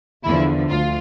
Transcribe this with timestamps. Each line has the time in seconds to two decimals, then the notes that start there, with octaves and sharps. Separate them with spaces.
0.24 E2 D3 F3 E4
0.69 D2 F4